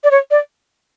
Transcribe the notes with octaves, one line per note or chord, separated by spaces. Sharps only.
D5
C#5
D5